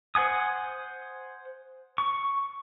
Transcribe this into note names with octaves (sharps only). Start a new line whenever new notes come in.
C5 F#5 G#5 D#6
C#6